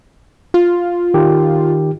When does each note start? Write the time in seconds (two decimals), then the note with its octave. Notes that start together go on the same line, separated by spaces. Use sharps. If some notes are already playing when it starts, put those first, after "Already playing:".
0.54 F4
1.14 D#3 G4